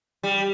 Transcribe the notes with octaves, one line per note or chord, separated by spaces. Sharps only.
G3